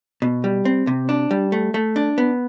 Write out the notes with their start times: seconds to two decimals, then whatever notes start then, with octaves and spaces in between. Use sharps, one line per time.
0.22 B2
0.44 G3
0.65 C4
0.87 C3
1.09 D4
1.31 G3
1.52 A3
1.74 A3
1.96 D4
2.18 B3